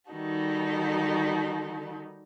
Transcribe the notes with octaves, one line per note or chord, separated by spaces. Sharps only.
D#3 G3 D#4 F#4 A4